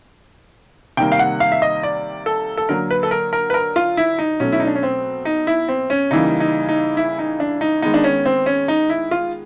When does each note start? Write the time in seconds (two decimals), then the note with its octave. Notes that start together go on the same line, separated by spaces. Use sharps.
0.97 C3 D#3 G3 A#3 G5
1.12 F5
1.19 F#5
1.40 F5
1.52 E5
1.62 D#5
1.83 D5
2.26 A4
2.57 A4
2.69 D3 F#3 A#3 A#4
2.91 B4
3.03 A4
3.11 A#4
3.33 A#4
3.50 B4
3.54 A#4
3.76 F4
3.97 E4
4.19 D#4
4.40 B2 F#3 A3 C#4
4.52 E4
4.60 D#4
4.67 D4
4.75 C#4
4.83 C4
5.25 D#4
5.47 E4
5.68 C4
5.90 C#4
6.11 C#3 E3 G3 A#3 D#4
6.40 D#4
6.69 D#4
6.97 E4
7.19 D#4
7.40 D4
7.61 D#4
7.82 D#3 G#3 B3 D#4
7.94 D4
8.04 C#4
8.26 C4
8.46 C#4
8.68 D#4
8.90 E4
9.11 F4